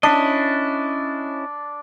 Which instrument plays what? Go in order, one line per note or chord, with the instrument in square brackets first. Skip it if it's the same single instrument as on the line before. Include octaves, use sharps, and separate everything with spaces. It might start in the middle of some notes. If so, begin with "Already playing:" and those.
[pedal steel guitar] C#4 E4 D#5 [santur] D4